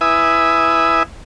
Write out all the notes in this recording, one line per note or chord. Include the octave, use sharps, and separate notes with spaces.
E4 B4 E5 G#5 D#6